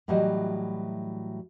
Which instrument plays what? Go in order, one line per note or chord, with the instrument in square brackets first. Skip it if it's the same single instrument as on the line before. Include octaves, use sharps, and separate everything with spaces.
[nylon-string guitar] A2 E3 F#3 G3 F#4 D#5